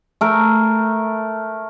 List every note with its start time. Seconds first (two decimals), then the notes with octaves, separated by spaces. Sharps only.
0.21 A3 A#4